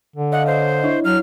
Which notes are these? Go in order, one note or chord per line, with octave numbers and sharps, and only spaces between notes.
D3
C#5 D#5 F5 F#5
C5
D4 E4 C#5
F#3 F6